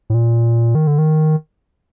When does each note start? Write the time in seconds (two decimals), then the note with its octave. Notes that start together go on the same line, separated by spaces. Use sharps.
0.10 A2
0.14 A#2
0.75 D#3
0.87 D3
0.98 D#3